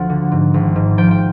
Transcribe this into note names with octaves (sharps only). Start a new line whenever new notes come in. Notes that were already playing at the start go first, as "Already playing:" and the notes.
Already playing: D2 F3 F#5
D3
G#2
G#1
G#2
F3 G5
G5